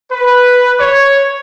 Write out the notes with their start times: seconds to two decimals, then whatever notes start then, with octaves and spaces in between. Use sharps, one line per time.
0.12 B4
0.80 C#5